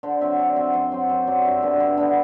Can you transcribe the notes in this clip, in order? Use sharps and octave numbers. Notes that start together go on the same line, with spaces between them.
D3 C5
F#3 C4 E5
D3 D5
F#3 C4
F#2 C5
F#3 C4 C5
F#2 C5
F#3 C4 D5
G2 E5
D3 G3 B3
G2
D3 G3 B3